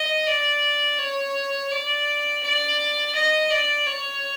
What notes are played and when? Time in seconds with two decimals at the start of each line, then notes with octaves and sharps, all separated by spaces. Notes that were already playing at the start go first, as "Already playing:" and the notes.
Already playing: D#5
0.27 D5
0.99 C#5
1.72 D5
2.43 D5
3.15 D#5
3.50 D5
3.87 C#5